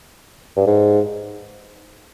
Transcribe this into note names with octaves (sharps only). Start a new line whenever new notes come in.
G2
G#2